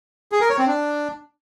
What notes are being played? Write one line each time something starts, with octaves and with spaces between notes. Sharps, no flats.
G#4
A#4
C#5
C4
D4